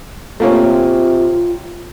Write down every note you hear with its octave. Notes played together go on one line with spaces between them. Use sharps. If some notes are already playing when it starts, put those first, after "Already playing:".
C3 A3 A#3 C#4 F4